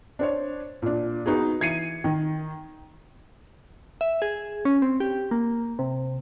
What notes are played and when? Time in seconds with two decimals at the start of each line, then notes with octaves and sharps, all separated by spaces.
0.19 D4 C5 C#5
0.82 A#2 D4
1.26 B3 D#4 F#4 G#4
1.61 E3 G#6 C7 C#7 D#7
2.04 D#3
4.01 E5
4.22 G#4
4.65 C#4
4.82 C4
5.00 G4
5.31 A#3
5.79 C3